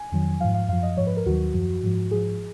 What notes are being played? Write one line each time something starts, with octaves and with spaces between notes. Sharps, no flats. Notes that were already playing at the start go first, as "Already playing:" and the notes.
Already playing: G#5
F2 D#3 F#3
G#2 F3 F5
F5
F#2 F3 F5
D#5
G#2 F3 C#5
B4
A#4
D#2 D#3 F#3 F#4
F#2 F3
G#2 F3
G#2 F3 G#4